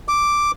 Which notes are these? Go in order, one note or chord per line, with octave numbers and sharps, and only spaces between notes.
D6